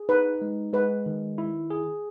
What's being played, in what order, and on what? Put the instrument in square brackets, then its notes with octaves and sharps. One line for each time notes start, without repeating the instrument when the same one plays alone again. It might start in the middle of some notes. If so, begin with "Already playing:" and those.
Already playing: [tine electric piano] G#4
[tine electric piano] D#4 [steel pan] B4
[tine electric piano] G#3
[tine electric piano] G#3 [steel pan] B4
[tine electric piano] D#3
E4
G#4